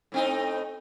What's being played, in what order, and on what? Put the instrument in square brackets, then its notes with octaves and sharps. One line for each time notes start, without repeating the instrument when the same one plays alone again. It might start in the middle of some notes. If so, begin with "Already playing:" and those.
[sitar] A2 C4 D#4